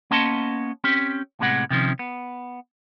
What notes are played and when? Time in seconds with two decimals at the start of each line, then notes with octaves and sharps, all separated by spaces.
0.11 A#3 B3 C#4 D#5 A5 C6
0.84 C4 C#4 G4
1.40 A2 C3 G#3 B3 F#5
1.70 C3 D#3 F3 C#4
1.99 B3